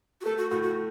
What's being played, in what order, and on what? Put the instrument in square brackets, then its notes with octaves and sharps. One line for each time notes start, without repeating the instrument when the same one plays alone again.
[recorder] F#4
[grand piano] A3 [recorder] A4
[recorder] F#4
[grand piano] A2 [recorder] F#4
[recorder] F#4